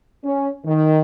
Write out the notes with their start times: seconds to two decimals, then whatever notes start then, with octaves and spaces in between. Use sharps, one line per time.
0.24 C#4
0.65 D#3